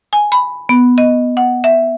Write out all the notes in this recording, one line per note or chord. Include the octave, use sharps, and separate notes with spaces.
G#5
B5
B3
D#5
F#5
E5